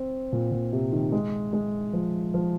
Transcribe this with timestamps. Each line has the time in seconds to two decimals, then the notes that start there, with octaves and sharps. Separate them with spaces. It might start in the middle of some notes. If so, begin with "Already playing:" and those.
Already playing: C4
0.32 A#2
0.52 A#2
0.73 C3
0.92 D#3
1.12 G#3
1.53 G#3
1.93 F3
2.34 F3